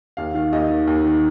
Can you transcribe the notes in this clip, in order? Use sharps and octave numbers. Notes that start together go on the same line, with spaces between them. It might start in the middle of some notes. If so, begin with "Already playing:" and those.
D#2 F5
D#3 F5
D#2 D#5
D#3
D#2
D#3